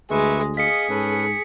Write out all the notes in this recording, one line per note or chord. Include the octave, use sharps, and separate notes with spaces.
D2 G#3 B4 E5 C#6
G#4 D#5 F5 B6 C#7
G#2 C#4 A4 B4